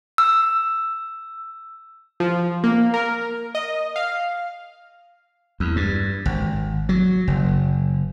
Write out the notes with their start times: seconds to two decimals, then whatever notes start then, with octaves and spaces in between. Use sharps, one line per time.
0.18 E6
2.20 F3
2.64 A#3
2.94 A#4
3.55 D#5
3.96 F5
5.60 E2
5.76 G2
6.26 G#1
6.89 F#3
7.28 F#1